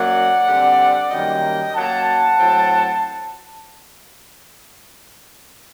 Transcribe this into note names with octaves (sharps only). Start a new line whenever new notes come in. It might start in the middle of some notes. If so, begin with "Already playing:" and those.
Already playing: F#2 F#3 A#3 D5 F#5
D3 G3 C4
F#2 D#3 G3 A#3 D#5 G5
F#2 F#3 A#3 F#5 A5
A2 F#3 C4